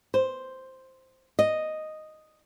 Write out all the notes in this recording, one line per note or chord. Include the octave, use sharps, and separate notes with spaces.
C5
D#5